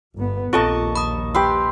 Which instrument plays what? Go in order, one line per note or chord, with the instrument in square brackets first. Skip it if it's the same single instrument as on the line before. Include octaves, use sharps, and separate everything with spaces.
[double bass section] G1 B3
[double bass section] A#1 D#2 [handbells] C4 F4 A4 [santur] D#5 A5 C#6
[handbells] B5 D#6
[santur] G4 B4 C6 [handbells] E6